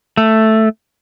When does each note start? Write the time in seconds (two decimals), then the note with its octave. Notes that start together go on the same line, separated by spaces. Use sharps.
0.17 A3